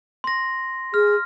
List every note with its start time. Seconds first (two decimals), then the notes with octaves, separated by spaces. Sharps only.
0.24 C6 A#6
0.94 G#4 F6